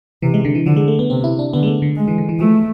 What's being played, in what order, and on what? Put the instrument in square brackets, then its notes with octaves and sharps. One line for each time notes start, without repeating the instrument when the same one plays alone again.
[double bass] C3 [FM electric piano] E3
[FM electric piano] G#3
D3
E3
[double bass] D3 [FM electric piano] F3
[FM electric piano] G#3
A3
B3
[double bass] C3 [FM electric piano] C4
[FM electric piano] E4
D4
[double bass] D3 [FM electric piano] B3
[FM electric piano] G#3
A3
D3
[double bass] G#3
[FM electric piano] E3
D3
E3
[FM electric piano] F3 [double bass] A3